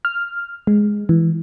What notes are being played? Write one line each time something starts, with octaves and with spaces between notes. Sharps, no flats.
F6
G#3
E3